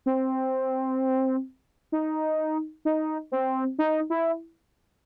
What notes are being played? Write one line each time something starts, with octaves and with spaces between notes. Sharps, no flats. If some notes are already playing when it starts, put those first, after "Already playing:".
C4
D#4
D#4
C4
D#4
E4